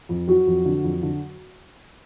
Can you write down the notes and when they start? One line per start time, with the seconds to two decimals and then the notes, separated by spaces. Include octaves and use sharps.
0.09 F2
0.28 F#3 F#4
0.47 F2
0.66 D3
0.84 F2
1.03 D3